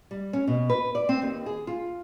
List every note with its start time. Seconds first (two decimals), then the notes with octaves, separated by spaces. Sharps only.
0.11 G3
0.33 C#4
0.47 B2
0.70 B4
0.95 D5
1.09 C4
1.22 D#2
1.46 G#4
1.67 F4